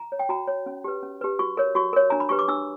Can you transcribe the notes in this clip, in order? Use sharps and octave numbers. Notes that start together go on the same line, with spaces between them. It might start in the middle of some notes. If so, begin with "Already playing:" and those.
Already playing: A#5
C#5
G5
F#4 A#5
C#5
C#4
G4 B4
C#4
G4 B4
F#4 C#6
A#4 C#5
F#4 C#6
A#4 C#5
D4 A#5
B5
G4 B4 C#6
D6
D4 E6